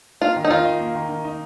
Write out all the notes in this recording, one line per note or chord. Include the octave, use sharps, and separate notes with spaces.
A#3 F4
D#3
D#4
D#3 F4
D#4
A#3
D#3
D#3
D#4